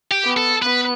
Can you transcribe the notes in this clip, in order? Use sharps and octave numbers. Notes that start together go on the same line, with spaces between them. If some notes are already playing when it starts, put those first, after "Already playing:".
G4
B3
A4
B3 B4